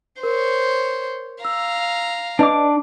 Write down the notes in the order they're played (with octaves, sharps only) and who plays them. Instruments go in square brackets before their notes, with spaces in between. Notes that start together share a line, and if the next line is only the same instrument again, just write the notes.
[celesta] A#4 [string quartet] C5 C#5
[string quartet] F5 A#5 [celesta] E6
[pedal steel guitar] D4 D6 [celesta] B4 D5 D#5